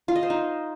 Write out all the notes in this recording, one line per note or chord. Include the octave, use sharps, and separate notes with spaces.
F4
D#5
C5
D#4